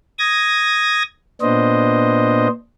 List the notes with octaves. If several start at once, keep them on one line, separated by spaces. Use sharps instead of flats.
D#6 G#6 A#6
A#2 B3 D4 C5 D#5